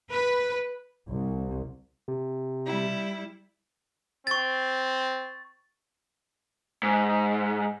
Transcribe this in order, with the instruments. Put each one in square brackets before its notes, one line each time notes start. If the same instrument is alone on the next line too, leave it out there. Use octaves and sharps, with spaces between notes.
[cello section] B4
[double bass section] C2
[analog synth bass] C3
[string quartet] G3 E4
[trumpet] C4 [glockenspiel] C#6 A6
[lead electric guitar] G#2